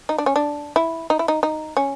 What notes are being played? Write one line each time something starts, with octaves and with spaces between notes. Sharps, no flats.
D#4
D4
C#4
D4
E4
D#4
E4
D#4
D#4
C#4